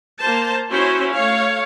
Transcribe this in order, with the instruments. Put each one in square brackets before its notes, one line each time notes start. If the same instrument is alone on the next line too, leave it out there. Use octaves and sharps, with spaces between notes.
[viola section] A#3 C5 A5
C#4 E4 F#4 C5
A3 C#5 F5